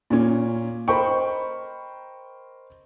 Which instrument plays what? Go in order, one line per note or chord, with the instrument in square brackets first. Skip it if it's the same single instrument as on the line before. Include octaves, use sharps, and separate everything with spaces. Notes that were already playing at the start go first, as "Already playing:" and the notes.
[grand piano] A#2 C#4
A#4 C5 D#5 G5 B5 C#6